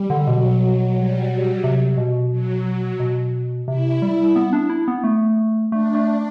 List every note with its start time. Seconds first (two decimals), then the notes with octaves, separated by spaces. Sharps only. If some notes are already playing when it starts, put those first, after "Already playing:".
Already playing: G3
0.10 D3
0.27 B2 F#3
0.95 G3
1.63 C3 F#3
1.98 B2
2.31 F#3
3.00 B2
3.68 C3 E4
4.02 G3
4.36 B3
4.53 D4
4.70 E4
4.88 B3
5.04 A3
5.72 A3 D4
5.95 A3